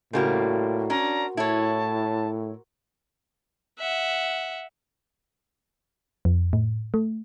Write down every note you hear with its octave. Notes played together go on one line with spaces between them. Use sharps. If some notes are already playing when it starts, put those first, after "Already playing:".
A2 C#3 G3 A#3 F#4 A#4 C5
C#4 D4 A#5
A2 E4 C#5 A5
E5 F#5
F2
A2
A3